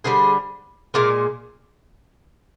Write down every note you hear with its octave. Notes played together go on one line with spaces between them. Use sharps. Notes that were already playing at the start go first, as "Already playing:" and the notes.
D3 G3 G#4 C5
A#2 G#3 A#4 D5